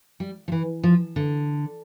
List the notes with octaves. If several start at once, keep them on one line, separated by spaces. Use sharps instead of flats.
G3
F3
E3
F3
D3